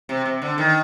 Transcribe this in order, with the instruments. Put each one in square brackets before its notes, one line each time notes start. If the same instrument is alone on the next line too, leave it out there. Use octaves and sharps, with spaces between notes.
[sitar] C3
C3
D3
D#3